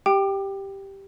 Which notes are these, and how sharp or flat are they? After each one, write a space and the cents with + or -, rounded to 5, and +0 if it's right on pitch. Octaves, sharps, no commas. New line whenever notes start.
G4 +0 G5 +0 D6 +25